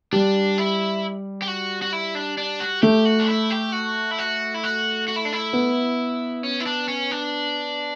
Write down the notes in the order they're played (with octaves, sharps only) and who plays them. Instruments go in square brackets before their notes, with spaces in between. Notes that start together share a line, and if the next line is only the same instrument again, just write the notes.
[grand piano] G3 [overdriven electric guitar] D4
[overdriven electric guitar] E4
G4
F#4
F#4
E4
D4
D4
F#4
[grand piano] A3 [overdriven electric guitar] G4
[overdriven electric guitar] F#4
D4
E4
G4
F#4
E4
F#4
E4
F#4
F#4
E4
D4
E4
[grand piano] B3
[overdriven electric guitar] C#4
E4
D4
C#4
D4